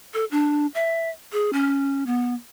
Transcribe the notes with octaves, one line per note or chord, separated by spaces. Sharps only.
A4
D4
E5
G#4
C#4
B3